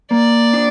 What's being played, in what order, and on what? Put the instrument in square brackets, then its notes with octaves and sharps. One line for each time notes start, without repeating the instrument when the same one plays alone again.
[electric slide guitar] A#3 [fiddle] D5
[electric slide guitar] D4